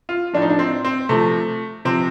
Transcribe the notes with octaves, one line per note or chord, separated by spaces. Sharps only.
F4
A2 F3 D4
D#4
D4
C4
C4
C3 F3 A3
C3 F3 C4